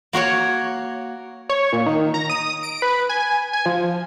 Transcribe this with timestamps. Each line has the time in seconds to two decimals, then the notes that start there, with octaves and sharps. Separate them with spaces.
0.13 A#3 F#4 A#4 C#5
1.49 C#5
1.73 A#2
1.86 D#3
2.14 A#5
2.30 D#6
2.63 D7
2.82 B4
3.09 G#5
3.53 G#5
3.66 F3